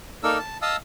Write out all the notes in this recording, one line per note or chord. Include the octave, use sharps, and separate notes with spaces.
A#3 D#4 A4 A#4 D5 E6
A5
D#5 F5 A5 D#6 E6